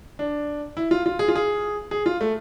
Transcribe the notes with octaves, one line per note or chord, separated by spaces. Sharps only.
D4
E4
F4
F4
G#4
F4
G#4
G#4
F4
A3